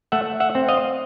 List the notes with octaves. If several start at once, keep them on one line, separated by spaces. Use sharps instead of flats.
A3 E5 F#5
E5 F#5
C4
D#5 F5